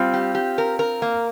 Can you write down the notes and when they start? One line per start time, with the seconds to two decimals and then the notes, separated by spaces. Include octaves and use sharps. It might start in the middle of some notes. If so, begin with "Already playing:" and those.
Already playing: G3 C4 F4
0.14 G4
0.35 G4
0.58 A#4
0.79 A#4
1.02 A#3